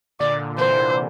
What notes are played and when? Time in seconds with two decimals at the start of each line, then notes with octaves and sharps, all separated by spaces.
0.20 A#2 D3 D5
0.58 C3 E3 C5